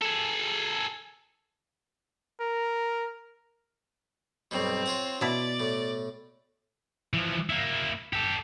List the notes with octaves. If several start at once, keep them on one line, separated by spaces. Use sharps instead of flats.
G#4 A4
A#4
B1 G2 B2 C4
F4 C#5 F#5
B2 E4 D5
A2
E3 F3
A#3 E4
G4 A4